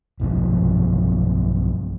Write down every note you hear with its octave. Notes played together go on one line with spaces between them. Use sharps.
B1 G2 C3 F3